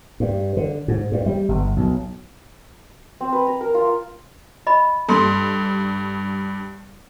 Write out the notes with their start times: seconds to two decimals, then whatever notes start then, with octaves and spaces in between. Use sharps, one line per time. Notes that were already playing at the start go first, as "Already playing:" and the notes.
0.20 G2
0.57 D3
0.88 G#2
1.12 G2
1.26 G3
1.49 G1
1.77 B1
3.21 C4
3.33 B4
3.47 A#5
3.61 A#4
3.75 F4
4.67 D#5 B5
5.09 G2 A4 C6